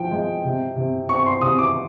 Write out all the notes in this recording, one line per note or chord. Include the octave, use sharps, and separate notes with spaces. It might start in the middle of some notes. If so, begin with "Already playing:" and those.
Already playing: F3 G5
G#3
C3
C3
C4 C#6
C6
C3 D#6
D6